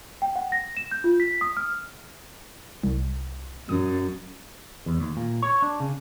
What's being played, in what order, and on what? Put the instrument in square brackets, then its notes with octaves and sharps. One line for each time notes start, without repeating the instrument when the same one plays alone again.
[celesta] G5
F#5
A#6
E7
G6
F4
B6
D#6
F6
[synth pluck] C2
[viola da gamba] F#2 [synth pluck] D#6
[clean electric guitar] E2
D#2
A#2
C#5
D4
C#3